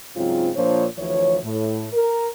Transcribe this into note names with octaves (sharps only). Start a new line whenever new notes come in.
G#2 C#3 F#3 C4 F4
A#2 F3 A#3 D4 C5 C#5
D2 E3 F3 C#5
A2
A#4